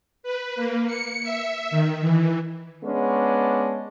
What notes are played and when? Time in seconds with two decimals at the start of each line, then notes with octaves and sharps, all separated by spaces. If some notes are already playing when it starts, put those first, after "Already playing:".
0.23 B4
0.56 A#3
0.87 C#7
1.23 E5
1.71 D#3
2.01 E3
2.84 G#3 B3 C#4 D4